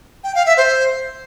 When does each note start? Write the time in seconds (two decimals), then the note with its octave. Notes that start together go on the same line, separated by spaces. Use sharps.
0.24 G5
0.35 F5
0.46 E5
0.57 C5